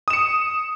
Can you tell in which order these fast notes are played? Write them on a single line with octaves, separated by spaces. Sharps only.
D#6 E7 C#7